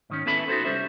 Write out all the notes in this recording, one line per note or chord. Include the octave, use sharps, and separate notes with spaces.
G#2 D#3 C#4
B3 C#4 E4 A4 E5 B5
D#4 F#4 G#4 A4 C5
C2 G3 C#4 C5 E5